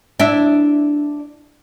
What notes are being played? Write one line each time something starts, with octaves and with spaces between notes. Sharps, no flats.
D4 E4 E5